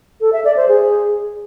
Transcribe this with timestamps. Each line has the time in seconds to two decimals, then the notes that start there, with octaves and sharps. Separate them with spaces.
0.21 A4
0.33 E5
0.44 D5
0.56 C5
0.68 G#4